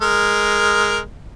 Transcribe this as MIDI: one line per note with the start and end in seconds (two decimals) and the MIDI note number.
0.02 0.99 56
0.02 0.99 70